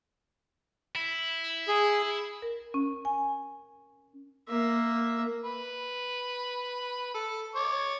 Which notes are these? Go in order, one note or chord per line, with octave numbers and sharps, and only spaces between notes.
E4
G#4
A#4
C#4
G#5
A#3 E5
B4
A4
C#5 D6